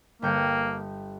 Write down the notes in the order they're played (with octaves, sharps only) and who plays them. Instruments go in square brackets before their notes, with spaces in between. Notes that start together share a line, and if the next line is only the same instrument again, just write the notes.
[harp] G1 G5 C#7 [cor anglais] A#3